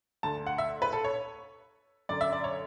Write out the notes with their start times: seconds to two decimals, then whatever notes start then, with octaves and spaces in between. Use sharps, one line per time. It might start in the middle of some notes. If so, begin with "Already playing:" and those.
0.23 D2 D3 A5
0.46 F#5
0.58 E5
0.82 B4
0.93 A4
1.04 C#5
2.09 F#2 D3 D5
2.21 E5
2.33 D5
2.44 C#5